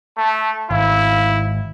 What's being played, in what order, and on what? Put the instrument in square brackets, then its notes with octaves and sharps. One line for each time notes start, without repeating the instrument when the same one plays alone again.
[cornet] A3 [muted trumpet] A5
[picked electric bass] G#1 [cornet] E4 [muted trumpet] F5